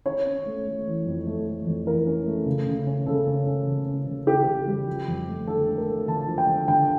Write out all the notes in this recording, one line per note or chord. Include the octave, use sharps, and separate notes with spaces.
C#4 C#5
C#4
A3
A3
E3
F2
A3
A3
F2
E3 A#4
C#4
A3
C#3
C#3
C#4
C#3 A4
C#4
C#4
C#3
C#4
C#3
C#4 G4
C#3
G3
F3
F2
A3
D3 A4
A3
A#4
A3
D3 A5
F3
G5
D3
D3 G5